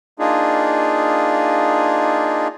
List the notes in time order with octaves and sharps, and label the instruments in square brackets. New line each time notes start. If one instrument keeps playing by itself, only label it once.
[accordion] A#3 D4 D#4 F4 G#4